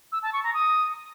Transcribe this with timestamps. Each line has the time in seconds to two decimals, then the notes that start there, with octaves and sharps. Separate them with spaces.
0.12 E6
0.23 A5
0.33 C#6
0.43 A#5
0.54 D#6